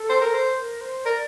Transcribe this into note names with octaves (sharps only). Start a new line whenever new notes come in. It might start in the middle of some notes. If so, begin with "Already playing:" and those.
Already playing: A4
C5
A#4
C5
A#4
C5
A#4 D5